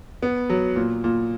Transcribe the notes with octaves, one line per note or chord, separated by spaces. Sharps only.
B3
F#3
A#2
A#2